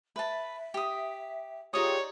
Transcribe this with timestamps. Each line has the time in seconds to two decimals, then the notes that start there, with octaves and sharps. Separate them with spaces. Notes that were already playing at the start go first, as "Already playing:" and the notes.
0.16 B4 E5 A5
0.74 G4 D#6
1.73 D#4 F4 G4 G#4 C#5 D5 D#6